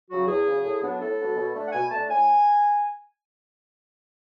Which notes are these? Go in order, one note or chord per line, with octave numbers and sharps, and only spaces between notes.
C#3 F#3 F#4
E2 G#4
C#3 F#3
A2
F#3 B3 D4
A2 A4
F#3 B3 D4
B2
A3 D4
F#5
B2 G#5
A3 D4 A5
A2 G#5